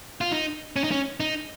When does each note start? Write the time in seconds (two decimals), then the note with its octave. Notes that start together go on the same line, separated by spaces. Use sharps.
0.21 F4
0.32 D#4
0.76 C#4
0.84 D#4
0.91 C#4
1.20 D#4